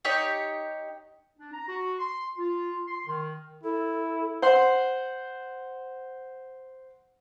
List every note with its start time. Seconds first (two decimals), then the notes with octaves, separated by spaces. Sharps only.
0.05 D#4 G4 C#5
1.38 D4
1.54 A#5
1.69 F#4
2.00 C6
2.38 F4
2.88 C6
3.07 D#3
3.63 E4 A4
4.42 C5 F#5 C6